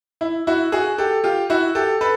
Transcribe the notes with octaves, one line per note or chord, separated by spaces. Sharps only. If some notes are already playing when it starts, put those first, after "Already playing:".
E4
E4 F#4
F#4 G#4
G4 A4
F4 G4
E4 F#4
G4 A4
A4 B4